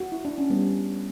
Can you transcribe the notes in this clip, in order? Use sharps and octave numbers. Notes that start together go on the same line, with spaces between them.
F#4
E4
D4
C#4
G3 B3